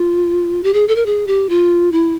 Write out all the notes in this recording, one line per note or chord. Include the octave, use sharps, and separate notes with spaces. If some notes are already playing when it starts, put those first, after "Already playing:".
Already playing: F4
G4
G#4
A4
A#4
G#4
G4
F4
E4